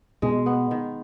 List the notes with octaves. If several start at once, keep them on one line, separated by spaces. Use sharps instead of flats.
B2 G#3
B3
D#3